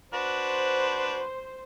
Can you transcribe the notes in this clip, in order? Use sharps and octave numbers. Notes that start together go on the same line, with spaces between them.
D4 F#4 B4 C5